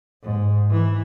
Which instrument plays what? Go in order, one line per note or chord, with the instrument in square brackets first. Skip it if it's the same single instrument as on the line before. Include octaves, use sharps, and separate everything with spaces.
[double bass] G#2
E3